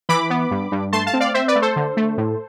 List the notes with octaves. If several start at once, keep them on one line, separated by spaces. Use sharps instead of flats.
E3 B5 D6
B3
G2
G2
A3 A5 C6
F5 A5
C4
D5 F5
C4 C5 E5
B4 D5
A3
A4 C5
D3
A3
A2